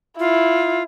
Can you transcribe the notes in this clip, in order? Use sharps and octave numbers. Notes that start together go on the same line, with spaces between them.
E4 F4